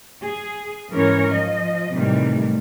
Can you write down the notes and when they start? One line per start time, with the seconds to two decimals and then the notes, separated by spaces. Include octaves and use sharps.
0.24 G#4
0.92 G#2 E3 C#4 A#4 C#5
1.32 F3 D#5
1.94 A2 C3 D#3 E3 G3